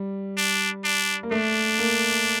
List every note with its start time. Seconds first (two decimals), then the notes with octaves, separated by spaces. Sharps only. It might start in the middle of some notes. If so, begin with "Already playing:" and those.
Already playing: G3
0.37 D4
0.84 D4
1.23 A#3
1.31 A3 D4
1.79 A#3